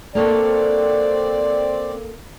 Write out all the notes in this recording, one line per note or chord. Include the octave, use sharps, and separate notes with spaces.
A#3 C4 A4 C#5 D5